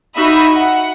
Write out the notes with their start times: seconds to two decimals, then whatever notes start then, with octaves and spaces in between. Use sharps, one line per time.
0.16 D#4 F#4 E5 B5 D#6
0.54 F#5